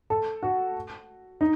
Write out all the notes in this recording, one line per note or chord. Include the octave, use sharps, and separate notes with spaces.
A4
F#4
D#4